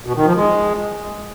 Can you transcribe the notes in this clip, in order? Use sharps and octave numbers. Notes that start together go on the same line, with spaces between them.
B2
D#3
F3
G#3